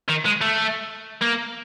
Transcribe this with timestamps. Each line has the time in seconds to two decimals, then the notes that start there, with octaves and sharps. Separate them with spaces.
0.08 D#3
0.25 G#3
0.41 A3
1.21 A#3